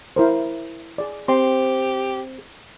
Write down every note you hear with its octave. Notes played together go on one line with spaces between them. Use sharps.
E4 A#4 C5
G#4 D5
C4 G4 C6